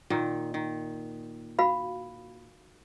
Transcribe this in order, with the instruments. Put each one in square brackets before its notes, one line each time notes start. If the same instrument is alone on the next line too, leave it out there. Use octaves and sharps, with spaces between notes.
[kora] A#2 D#3
D#3
[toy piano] F#4 F5 B5